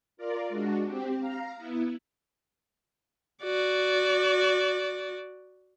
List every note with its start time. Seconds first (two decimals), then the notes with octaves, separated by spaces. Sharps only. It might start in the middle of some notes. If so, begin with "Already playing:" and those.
0.17 F4 A#4 D5
0.49 G#3 D4 F#4
0.85 C4 G4
1.19 F5 A#5
1.57 B3 E4
3.44 F#4 D5